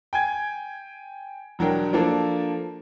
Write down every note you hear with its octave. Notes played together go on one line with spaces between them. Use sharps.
G5 G#5 G#6
E1 F#3 D4 A#4 G5
F3 A#3 D4 A4